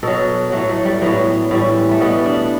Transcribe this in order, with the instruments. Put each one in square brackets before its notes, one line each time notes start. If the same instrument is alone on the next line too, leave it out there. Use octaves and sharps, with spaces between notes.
[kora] B2 F#3 A4
A2 F#3 A3
A3
G3
A2 F#3 B3
A2 E3 G3
A3
B2 G3 B3
D4